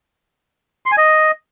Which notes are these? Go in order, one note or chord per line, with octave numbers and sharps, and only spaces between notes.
C6
G#5
D#5